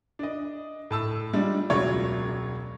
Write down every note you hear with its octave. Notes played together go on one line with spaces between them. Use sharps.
D4 D#5
A2 A5 E6
G3 G#3 D4 D#4 F4
E1 C#2 F#3 F4 C#5 D5